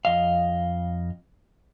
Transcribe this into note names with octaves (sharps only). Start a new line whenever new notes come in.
F2 D#5 F5